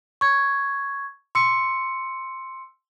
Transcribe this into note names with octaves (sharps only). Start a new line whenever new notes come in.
C#6 G#6
C6 E6 C#7